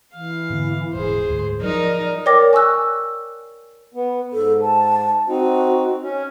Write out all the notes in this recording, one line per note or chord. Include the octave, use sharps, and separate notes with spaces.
E3 F5
G#2 D3 B3
D#1 G#2 C#3 G#4 C5
F#1 D2 G#2
F3 F#3 D#4 A#4 D5
A#4 C#5 D5 G5 D6 A#6
G#5 C#6 D#6 E6 F#6
B3
G#2 A4
A5
C4 D#4 F#4
C#4